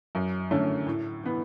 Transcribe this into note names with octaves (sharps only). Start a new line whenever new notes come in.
F#2
D3 A3 C#4
A2
E3 B3